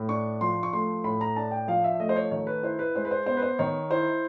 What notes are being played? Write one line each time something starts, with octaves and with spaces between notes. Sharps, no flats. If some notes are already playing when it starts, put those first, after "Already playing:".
Already playing: A2
D4 C#6
F3 C6
C#6
A3 C6
A2 B5
A#5
D4 A5
G5
F3 F5
E5
A3 D#5
C5
C#5
D#3 C#5
B4
E4 C5
B4
G#3 C5
B4
C5
B3 C5
B4
C5
D#3 C#5
E4 C5